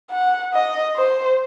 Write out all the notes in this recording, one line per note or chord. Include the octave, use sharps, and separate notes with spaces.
F#5
D#5
C5